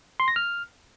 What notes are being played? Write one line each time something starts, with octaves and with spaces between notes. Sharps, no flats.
C6
A#6
F6